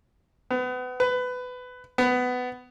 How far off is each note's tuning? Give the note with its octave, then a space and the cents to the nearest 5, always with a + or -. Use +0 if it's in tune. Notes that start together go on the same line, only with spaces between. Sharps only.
B3 +30
B4 +20
B3 +15